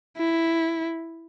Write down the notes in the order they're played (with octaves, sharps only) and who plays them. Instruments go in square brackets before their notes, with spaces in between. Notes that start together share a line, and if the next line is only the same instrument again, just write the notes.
[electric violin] E4